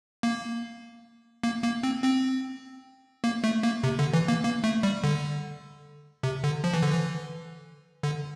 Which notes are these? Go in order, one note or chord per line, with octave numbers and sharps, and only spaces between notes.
A#3
A#3
A#3
C4
C4
A#3
A3
A#3
C3
D3
E3
A#3
A#3
A3
G3
D3
C3
D3
F3
E3
D3
E3
D3